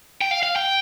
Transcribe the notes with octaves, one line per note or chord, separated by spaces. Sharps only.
G5
F5
F5
G5